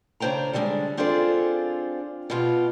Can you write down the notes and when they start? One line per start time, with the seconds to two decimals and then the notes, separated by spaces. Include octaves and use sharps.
0.20 C#3 D4 C5 G5 A#5
0.53 D3 G3 G#3 C#4 D4
0.98 C4 D4 F4 G#4 A4 C5
2.30 B2 B3 F4 G4